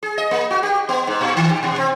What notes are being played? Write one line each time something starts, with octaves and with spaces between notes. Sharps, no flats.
G#4
D#5
A#3
F#4
G4
B3
G#2
A#2
D#3
G4
B2
C4